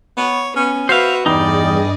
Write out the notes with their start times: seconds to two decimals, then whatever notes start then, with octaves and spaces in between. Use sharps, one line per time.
0.17 B3 C#5
0.56 B3 C#4
0.89 F#4 B4 C5 E5 F5
1.26 E2 G2 G3 D#4 G#4 D5 D#5